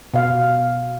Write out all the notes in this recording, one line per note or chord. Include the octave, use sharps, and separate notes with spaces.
B2 F5